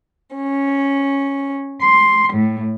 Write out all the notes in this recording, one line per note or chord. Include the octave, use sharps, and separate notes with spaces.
C#4
C6
A2